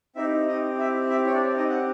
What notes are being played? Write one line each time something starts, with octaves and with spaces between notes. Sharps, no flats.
C4 D#4 E4 G4 E5
D#4 D#5
E4 E5
E4 E5
C#5
D4 D5
D#4 D#5
F#5